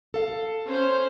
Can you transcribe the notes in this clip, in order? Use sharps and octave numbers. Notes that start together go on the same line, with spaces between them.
A4 F5
C#4 C5